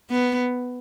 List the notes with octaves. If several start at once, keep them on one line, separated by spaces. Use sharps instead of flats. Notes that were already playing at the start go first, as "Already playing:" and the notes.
B3